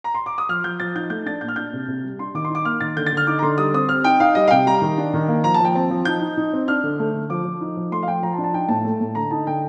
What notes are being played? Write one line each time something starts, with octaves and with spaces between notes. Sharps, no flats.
A#5
C6
D6
D#6
F3 F6
F3 G6
F3 A6
D#4 G6
A3 G6
D4 A6
A#2 G6
F6
D4 G6
C3
C3
G3
D4 C6
D#3 D6
C6
D#4
D6
A#3 F6
D#3 A6
D3 G6
A6
D3 F6
D#4 D6
A#5
D3 C6
G3 D#6
C4 D#6
C4 F6
D#4 G5
D#4 F5
G3 D#5
F5
C3 G5
G3 A#5
D#3
D4
D#3
A#3
F3 A#5
A5
F3 G5
C4 A5
F3
D#4 G6
D#4
D#4
C4
D4 F6
D3
A3
D3
F3 D6
F3
D#4
F3
A3 C6
F5
F3 G5
F3 A#5
A5
D4
A5
D#4 G5
A2 A5
A3
A2
D3 A#5
D#4 A5
D3 G5